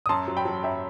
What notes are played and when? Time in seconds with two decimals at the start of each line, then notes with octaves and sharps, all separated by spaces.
0.06 D#6
0.09 F#2 A5 C6
0.28 F#3
0.37 G5 B5
0.45 F#3
0.63 F#2 E5 G5